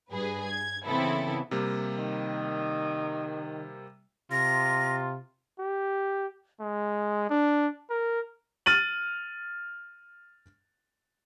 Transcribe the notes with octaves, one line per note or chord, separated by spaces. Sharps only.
G2 G#4 B4
G#6
C#3 E3 B3 C4 E4 A4
C3 G3 A#3
D#3
C3 F4 A#6
G4
G#3
D4
A#4
F6 A6 D#7 F#7